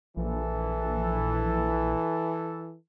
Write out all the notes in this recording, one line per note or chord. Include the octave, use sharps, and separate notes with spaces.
A#1 E3 A4